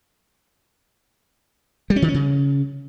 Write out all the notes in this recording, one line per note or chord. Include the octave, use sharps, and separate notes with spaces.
G3
C#4
D#3
C#4
C#3